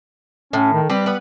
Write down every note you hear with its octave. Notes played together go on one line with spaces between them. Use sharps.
A2 C#4
D#3
G3 C4 G4 B4
B3 B4